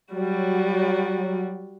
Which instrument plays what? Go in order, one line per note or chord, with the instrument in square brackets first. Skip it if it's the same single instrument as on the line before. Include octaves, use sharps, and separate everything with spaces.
[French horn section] F#3 [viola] G3 F#4